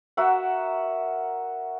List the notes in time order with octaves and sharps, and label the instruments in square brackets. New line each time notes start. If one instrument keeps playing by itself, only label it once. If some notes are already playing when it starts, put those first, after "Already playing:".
[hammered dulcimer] F#4 A#4 E5 F#5